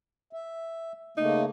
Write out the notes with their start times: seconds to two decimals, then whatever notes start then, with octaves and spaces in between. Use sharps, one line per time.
0.33 E5
1.17 C#3 A3 A#3 D#4